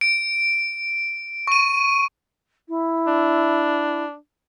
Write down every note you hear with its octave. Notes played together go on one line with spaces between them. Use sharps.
D7
C#6 D#7
E4
D4